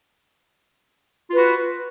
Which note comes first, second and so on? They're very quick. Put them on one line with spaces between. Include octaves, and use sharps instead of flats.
F4 B4 F#4